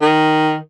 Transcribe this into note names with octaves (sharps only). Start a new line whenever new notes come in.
D#3